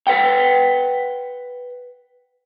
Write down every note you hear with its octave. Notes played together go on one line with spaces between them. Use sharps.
B4 F#5 G5